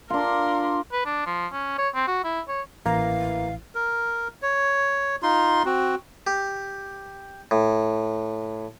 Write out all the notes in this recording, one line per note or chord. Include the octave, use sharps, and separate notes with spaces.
D4 F4 A#4 C6
B4
D4
F3
C#4
C#5
C4
F#4
E4
C#5
A1 E3 A#3 F5 A#5
A#4
C#5
D#4 F4 C6
C4 F#4
G4
A2